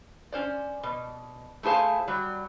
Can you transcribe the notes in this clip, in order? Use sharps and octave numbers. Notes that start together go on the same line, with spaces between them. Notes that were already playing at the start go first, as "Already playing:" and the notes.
C#4 C5 D5
B2
A3 E4 G#4 C5 F5
F#3 G3